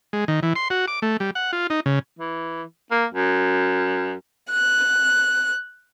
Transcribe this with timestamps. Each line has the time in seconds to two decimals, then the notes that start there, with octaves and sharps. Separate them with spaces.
0.13 G#3
0.28 D#3
0.43 E3
0.56 C6
0.70 F#4
0.88 D6
1.02 A3
1.20 G3
1.35 F#5
1.53 F4
1.70 D#4
1.86 C#3
2.19 E3
2.91 A#3
3.14 F#2
4.51 F#6